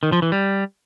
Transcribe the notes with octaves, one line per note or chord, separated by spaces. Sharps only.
D#3
F3
E3
G3